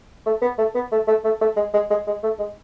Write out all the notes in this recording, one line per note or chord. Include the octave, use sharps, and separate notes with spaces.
A3
B3
A3
B3
A3
A3
A3
A3
G#3
G#3
G#3
G#3
A3
G#3